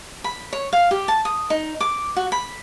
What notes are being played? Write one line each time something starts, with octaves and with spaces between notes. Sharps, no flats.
B5
C#5
F5
G4
A5
D#6
D#4
D6
F#4
B5